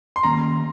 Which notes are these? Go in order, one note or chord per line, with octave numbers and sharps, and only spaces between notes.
C6
D#3 A#3 C#4 A#5